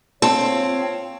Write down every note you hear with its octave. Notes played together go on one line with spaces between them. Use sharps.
C4 F4 C#5 A5